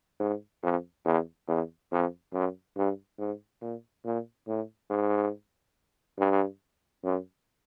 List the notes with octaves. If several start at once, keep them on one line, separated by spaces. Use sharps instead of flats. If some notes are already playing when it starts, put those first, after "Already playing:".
G#2
F2
E2
E2
F2
F#2
G2
G#2
A#2
A#2
A2
G#2
G2
F#2